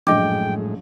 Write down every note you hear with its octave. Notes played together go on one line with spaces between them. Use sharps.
A#1 F#2 A2 G#3 D#5 G5 D6